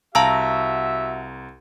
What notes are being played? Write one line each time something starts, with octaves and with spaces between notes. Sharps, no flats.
C2 F#4 E5 F5 A5 A#5 E6